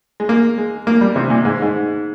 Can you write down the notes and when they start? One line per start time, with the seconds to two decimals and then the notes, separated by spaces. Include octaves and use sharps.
0.20 G#3
0.29 A#3
0.58 G#3
0.87 A#3
1.01 G3
1.16 C3
1.30 A#2
1.45 G#2
1.62 G#2